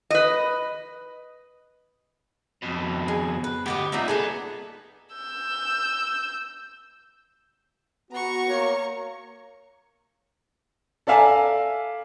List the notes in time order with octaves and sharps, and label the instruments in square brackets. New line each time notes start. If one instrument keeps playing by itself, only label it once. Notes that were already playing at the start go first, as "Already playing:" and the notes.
[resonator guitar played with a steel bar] B4 D#5
[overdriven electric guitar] F2 B2
[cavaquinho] G#4
B4
[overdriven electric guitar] D2 B3 [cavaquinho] G4 D#5 D6
[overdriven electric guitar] C2 A#2 [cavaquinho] D#4 D5 E5
[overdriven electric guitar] B3 [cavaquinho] G#4 A4 D#5
[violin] E6 G6
[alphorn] B3 [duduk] F#4 [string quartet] A#5 C#6
[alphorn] A#3 [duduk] C#5
[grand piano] A4 D5 E5 F5 G#5 A#5